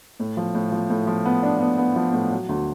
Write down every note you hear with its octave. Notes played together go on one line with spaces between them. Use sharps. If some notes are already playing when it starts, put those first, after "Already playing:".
A2
F3
A2
F3
A2
F3
B3
D4
B3
B3
F3
A2
F#3
D2